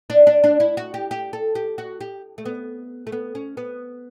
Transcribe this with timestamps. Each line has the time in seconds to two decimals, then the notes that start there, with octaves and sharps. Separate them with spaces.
0.10 D4
0.27 D4
0.44 D4
0.60 E4
0.77 F#4
0.94 G4
1.11 G4
1.33 A4
1.55 G4
1.78 F#4
2.01 G4
2.38 A3
2.45 B3
3.07 A3
3.12 B3
3.35 C#4
3.57 B3